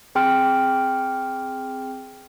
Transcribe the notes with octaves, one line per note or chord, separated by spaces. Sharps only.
C4 G#4 G5 C6 F6 D7